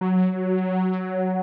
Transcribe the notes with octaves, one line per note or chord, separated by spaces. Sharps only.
F#3